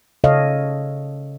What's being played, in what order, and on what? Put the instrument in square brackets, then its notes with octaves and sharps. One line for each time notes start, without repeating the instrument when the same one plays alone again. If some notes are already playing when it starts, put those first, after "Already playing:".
[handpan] C#3 A4 C#5 D#5 F5